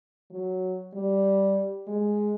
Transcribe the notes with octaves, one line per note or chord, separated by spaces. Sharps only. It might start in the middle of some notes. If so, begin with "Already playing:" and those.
F#3
G3
G#3